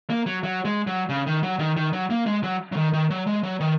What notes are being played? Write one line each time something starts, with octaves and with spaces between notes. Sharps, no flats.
A#3
F#3
F#3
G#3
F#3
C#3
D#3
F#3
D#3
D#3
F#3
A#3
G#3
F#3
F#3
D#3
D#3
F#3
G#3
F#3
D#3